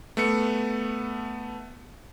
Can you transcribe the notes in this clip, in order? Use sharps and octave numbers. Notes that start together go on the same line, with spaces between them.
A3 B3 C#7